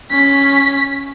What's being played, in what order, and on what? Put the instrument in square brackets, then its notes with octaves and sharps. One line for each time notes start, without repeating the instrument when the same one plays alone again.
[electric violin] C#4 B6